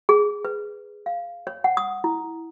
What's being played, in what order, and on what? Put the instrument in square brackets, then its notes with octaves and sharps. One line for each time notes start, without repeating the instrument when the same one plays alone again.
[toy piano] G#4
B4
F5
C#5
F#5
D#6
E4